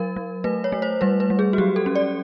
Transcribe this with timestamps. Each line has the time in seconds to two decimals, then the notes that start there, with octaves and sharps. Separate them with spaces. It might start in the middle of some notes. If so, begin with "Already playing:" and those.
Already playing: F#3 A#4
0.16 F#3
0.44 A3 B4
0.64 C#5
0.72 A3
0.82 C5
1.01 G3 B4
1.20 B4
1.30 G3
1.39 G#4
1.53 F#4
1.58 F#3 G4
1.76 A4
1.86 C#4
1.95 D5